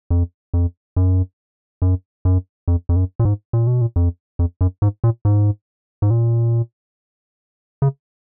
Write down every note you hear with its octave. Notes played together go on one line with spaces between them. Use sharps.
F2
F2
F#2
F#2
F#2
F2
F2
F#2
A#2
G#2
A#2
B2
A#2
F2
F2
F#2
G#2
A#2
G#2
G#2
A#2
C#3